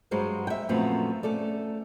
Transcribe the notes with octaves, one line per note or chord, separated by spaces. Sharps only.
G2 F#3 G#3 F#4 C5 F5
E5 G5
F#2 A#2 F3 A3 B3 C4
A3 C#4 A4 D5